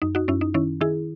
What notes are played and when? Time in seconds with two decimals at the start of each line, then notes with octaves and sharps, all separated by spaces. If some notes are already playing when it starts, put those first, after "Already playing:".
0.02 F#2 D#4
0.15 D#4 F#4
0.28 F#2 C#4 E4
0.41 D#4
0.54 D#3 C#4 E4
0.81 D#3 E4 G#4